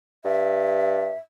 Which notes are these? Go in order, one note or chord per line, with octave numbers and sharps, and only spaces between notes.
G2 E5